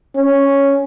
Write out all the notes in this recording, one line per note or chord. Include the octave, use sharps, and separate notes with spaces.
C#4